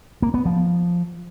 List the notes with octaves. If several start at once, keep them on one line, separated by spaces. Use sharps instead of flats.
A#3
B3
F3